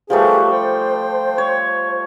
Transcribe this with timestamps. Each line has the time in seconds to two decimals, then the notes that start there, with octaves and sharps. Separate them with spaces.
0.10 F3 G3 A3 G4 G#4 B4 A5
0.51 C5 G5
1.38 C#5